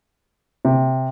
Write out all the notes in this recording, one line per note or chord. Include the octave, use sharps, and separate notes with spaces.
C3